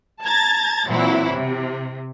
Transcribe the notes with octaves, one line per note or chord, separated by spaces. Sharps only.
A5 A#5 G#6 A6
A#2 E3 F#3 C4 E4
C3